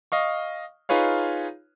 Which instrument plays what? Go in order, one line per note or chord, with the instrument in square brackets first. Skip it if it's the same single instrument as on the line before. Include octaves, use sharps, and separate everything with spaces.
[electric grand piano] D#5 F5 C#6
D#4 F4 G#4 B4 C#5 F5